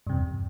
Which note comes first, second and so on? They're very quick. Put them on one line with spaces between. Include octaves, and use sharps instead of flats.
G2 C3 E2